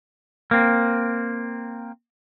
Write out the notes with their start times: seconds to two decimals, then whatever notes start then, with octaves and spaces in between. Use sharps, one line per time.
0.51 A#3 C4